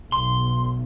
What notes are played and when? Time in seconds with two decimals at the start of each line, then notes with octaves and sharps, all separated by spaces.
0.12 B1 C6